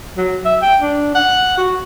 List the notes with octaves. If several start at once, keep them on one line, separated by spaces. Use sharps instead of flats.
F#3
E5
G5
D4
F#5
F#4